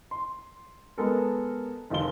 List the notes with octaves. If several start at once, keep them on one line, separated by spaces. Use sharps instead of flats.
C6
G#3 B3 A4 A#4
F1 D#3 F4 C6 G7